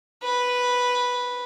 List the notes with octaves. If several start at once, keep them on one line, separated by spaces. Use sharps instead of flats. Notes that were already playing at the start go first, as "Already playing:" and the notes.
B4